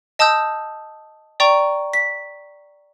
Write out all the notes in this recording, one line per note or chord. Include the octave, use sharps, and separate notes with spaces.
D#5 A5 D#6 E6 G6
D5 G5 A#5 C#6
B6